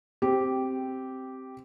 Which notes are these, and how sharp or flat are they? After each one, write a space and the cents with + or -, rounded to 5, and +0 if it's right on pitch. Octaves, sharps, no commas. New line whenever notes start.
C4 +0 G4 -10